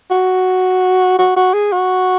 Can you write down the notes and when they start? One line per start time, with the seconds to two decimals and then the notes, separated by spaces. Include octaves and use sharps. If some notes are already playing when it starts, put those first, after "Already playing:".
0.11 F#4
1.19 F#4
1.36 F#4
1.54 G#4
1.72 F#4